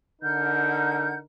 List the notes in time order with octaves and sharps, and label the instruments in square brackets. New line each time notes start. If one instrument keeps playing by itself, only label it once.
[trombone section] D3 D#4 A#4 [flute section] F#5 F6 G6